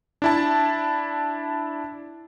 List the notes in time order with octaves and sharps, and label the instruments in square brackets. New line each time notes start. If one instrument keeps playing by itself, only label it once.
[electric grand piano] D4 E4 A5